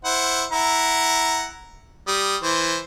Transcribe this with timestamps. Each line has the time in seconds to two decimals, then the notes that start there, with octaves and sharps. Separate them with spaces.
0.05 E4 C5 F#5
0.52 E4 F#5 A#5
2.08 G3 D#6
2.43 E3 C5